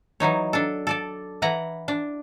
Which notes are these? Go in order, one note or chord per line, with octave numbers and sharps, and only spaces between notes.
E3 F#3 D#4 C#5
D4 A4
A4 D5 A5
E3 E4 F#5 A#5
D4